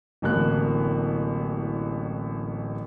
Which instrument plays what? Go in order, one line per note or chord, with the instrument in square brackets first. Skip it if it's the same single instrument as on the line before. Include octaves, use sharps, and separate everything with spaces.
[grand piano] D1 A1 A#3 F#6